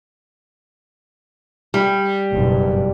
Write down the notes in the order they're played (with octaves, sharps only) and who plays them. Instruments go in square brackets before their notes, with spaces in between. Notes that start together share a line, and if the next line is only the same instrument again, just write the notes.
[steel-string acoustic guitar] G3
[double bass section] F#1 G2 B2